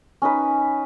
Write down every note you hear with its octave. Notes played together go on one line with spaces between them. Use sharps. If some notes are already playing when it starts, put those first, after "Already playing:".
C#4 D#4 B4